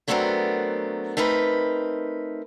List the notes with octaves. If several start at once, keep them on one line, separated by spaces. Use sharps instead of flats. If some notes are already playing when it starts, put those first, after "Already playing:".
F#3 A3 B3 C4 D4 A#4
A3 C4 D#4 A#4 B4